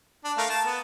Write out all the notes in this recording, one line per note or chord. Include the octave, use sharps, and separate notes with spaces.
D4
A3 A#4 F5
A5
B3